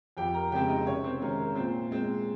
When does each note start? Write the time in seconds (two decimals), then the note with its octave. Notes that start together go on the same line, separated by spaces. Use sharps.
0.17 F2 G4 G5
0.34 A#4 A#5
0.52 C#3 G#3 C4 G4 G5
0.68 D#4 D#5
0.86 C3 C#4 C#5
1.04 C4 C5
1.21 D#3 G#3 C#4 A#4
1.38 A#4
1.55 A#2 C4 C5
1.91 G#3 C4